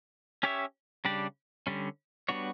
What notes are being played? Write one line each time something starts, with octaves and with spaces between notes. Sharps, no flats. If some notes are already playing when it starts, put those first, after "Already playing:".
C#4 G4 C#5 E5
C#3 G3 D4 G4 D5
D3 G3 C#4
G3 B3 D4 F#4 C#5